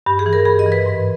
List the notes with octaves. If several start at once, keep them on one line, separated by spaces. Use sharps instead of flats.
G2 G4
G#4
E3
A#4
G2 G#4
D#5
E3
B4
G#2